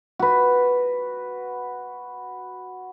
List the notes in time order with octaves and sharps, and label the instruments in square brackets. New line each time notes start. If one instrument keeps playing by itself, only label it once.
[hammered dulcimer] F#4 B4